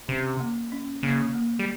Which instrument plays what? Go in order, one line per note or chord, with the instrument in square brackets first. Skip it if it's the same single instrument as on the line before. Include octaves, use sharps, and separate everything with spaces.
[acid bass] C3 [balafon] C#4
[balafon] A#3
C#4
[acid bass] C#3 [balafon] A#3
[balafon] A#3
[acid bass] G3